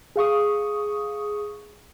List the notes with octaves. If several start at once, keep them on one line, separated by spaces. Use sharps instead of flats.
G#4 F5 C#6 D#6